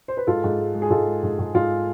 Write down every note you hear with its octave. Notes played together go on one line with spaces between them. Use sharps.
C5
B4
G#2 F4 A4
G#2
G#3
G#3
G#4
G#2 F4 A4
G#3
G#2
G#2
G#2 F4